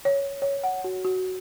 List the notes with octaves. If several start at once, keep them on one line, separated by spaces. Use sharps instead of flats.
C#5
C#5
F#5
F#4
F#4